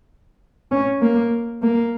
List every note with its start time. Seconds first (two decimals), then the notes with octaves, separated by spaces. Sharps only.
0.72 C#4
1.02 A#3
1.62 A#3